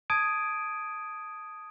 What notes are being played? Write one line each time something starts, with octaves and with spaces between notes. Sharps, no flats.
A5 D#6 G#6 D7 D#7